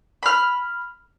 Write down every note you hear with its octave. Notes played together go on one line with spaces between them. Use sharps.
B5 F6